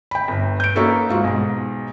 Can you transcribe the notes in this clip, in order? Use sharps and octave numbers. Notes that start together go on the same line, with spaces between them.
G5 B5
G1
G6 D7
A#3 C#4 D#4 F#4 A4 B4
G#2 F4 F#4
B1 G#2